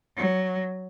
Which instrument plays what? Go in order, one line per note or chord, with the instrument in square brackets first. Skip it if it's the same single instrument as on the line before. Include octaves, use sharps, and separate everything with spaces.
[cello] F#3